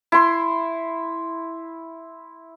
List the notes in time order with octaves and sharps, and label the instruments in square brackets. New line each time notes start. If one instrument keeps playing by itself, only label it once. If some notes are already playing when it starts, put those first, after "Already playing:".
[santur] E4 C6